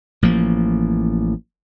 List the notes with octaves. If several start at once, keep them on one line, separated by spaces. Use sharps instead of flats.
A1 F3 A#3